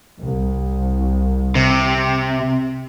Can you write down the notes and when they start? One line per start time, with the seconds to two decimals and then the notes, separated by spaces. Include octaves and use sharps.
0.19 C2
1.55 C3